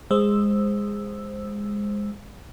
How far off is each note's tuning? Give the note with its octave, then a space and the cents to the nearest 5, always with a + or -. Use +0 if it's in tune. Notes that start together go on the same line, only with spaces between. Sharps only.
G#3 -15 C5 +5 E6 +0